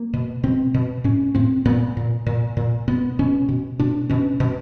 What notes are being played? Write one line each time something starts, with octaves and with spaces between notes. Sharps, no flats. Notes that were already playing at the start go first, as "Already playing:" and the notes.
Already playing: A#3
B2
B2 C4
B2
A2 C#4
A2 C4
A#2 B3
A#2
A#2
A#2
B2 B3
B2 C#4
B2
B2 D4
B2 C#4
B2